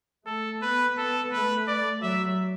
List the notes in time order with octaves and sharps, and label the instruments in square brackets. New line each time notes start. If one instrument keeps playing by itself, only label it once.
[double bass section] A3 [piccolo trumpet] A4
[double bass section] B3 [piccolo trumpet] B4
[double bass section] B3 [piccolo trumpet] A4
[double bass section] A3 [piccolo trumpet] B4
[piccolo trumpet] D5
[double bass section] F#3 [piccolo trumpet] E5